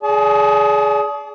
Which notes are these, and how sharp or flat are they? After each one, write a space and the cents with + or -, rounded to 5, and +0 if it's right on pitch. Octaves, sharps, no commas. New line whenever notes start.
G#4 +15 D5 -30 A5 -40